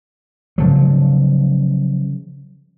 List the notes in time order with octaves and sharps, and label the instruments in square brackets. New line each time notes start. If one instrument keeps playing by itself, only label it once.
[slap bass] C#3 F3 F#3